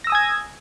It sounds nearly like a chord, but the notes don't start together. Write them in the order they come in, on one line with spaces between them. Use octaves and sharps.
A#6 E6 D#6 G#5 G#6